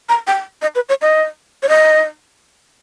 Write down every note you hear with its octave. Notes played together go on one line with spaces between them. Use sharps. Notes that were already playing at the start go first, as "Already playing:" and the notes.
A#5
G5
D#5
B4
C#5
D#5
C#5
D#5